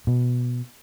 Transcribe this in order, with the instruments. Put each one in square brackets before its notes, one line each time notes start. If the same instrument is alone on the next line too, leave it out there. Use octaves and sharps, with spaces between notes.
[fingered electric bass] B2